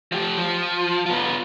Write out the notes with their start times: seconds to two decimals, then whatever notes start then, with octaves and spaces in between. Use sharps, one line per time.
0.12 F3 G4
0.37 F3
1.06 B3 F4